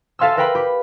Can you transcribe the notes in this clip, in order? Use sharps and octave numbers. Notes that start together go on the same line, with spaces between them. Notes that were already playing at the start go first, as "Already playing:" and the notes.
A4 E5 F5 G#5 C6 E6
A#4 B4 F5 G5 B5
G4 B5